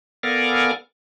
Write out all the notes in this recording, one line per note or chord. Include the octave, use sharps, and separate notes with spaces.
B3 A4 A#4 D5 F5 G#5